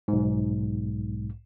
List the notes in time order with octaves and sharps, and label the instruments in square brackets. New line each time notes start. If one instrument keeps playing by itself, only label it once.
[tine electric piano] B1 G#2